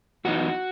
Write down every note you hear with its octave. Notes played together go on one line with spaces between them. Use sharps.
F#2 E3 B3 D#4 F#4